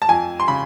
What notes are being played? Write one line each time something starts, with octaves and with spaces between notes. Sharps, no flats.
A5
F2 G#5
C6
C#3 B5